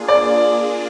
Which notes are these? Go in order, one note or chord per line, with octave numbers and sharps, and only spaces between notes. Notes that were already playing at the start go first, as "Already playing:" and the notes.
Already playing: A#3 D4 F4 G#4
D5